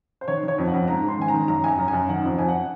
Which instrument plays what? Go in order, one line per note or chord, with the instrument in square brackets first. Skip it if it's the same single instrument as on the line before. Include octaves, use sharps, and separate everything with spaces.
[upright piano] C5
D#3 C#5
D#3
C#5
F2
F#5
F2
G#2 A#5
G#2
C6
D#3 G#5
A#5
D#3
F#2 A#5
F#2 G#5 A#5
F#2
G#5
F#2
D#3 F#5
F2
F2 G#5
F#5